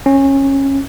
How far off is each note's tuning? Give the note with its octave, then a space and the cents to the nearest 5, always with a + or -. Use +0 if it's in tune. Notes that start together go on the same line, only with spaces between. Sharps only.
C#4 -20